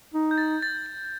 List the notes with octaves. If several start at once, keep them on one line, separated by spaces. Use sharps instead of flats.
D#4
G6
A6
A6
A6